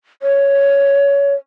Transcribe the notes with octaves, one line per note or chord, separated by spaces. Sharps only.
C#5